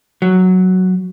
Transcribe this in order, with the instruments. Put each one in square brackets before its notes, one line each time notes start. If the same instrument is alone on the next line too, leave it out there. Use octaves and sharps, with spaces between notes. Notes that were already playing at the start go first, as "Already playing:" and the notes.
[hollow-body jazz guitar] F#3